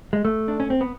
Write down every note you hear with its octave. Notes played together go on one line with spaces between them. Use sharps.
G#3
A3
D4
C#4
C4
B3